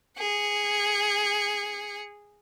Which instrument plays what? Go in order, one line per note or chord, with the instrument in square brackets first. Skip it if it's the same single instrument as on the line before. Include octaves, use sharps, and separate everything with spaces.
[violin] G#4 C#7